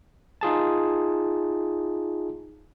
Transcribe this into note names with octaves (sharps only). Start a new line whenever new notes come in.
D#4 F4 G#4 A5